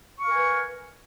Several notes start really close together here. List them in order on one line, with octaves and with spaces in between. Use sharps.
C#6 F5 A#4 G#5 B4